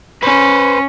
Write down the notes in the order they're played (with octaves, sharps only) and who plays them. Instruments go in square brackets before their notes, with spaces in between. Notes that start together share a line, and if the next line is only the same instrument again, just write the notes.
[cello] C#4 [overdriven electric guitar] B4 C5